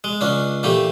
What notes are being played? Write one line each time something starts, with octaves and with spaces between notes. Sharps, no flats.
G#3
C#2 C#4 D4
A#2 E3 A3 G4